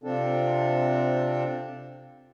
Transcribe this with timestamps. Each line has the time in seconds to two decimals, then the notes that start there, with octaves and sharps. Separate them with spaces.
0.04 C3 F3 C4 D4 A4